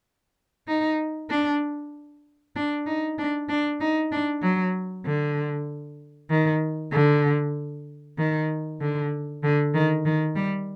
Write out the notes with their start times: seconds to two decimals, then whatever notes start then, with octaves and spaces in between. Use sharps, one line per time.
0.68 D#4
1.30 D4
2.56 D4
2.87 D#4
3.18 D4
3.49 D4
3.80 D#4
4.12 D4
4.42 F#3
5.05 D3
6.31 D#3
6.92 D3
8.18 D#3
8.80 D3
9.43 D3
9.74 D#3
10.06 D#3
10.36 G3